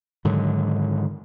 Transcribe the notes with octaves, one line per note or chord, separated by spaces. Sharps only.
G#2 D3 D#3 F#3